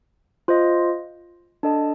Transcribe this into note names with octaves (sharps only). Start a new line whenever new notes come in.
F4 C5 D#5
D4 A4 D#5 A5